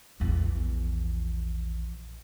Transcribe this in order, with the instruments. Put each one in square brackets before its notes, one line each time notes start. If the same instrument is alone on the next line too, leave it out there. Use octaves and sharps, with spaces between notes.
[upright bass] A#1 E2